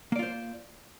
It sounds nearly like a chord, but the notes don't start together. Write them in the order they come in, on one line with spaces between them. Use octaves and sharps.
A#3 D5 F4 C5